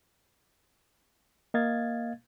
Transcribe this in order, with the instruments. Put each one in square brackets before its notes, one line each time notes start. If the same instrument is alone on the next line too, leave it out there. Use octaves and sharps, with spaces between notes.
[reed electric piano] A#3 D#5 F5 G#6 A6